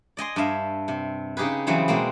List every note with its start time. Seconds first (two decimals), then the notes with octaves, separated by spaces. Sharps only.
0.17 D5 D#5 G#5 C6
0.36 G2 D4 E5 F5
0.88 C3
1.37 C#3 D#4 G4 G#4 B4
1.67 C#3 E3 F#3 G3 B3 C4
1.88 B2 G#3 A#3 C4